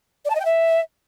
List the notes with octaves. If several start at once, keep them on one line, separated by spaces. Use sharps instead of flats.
D5
A5
D#5
G5
E5